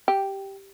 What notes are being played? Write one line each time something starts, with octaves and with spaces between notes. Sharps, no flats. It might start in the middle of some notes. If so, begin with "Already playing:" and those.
G4